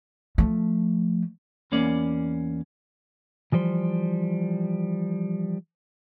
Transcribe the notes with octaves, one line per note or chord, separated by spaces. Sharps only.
F3 A3
E2 A#3 C#4 D5
E3 F3 G3 C5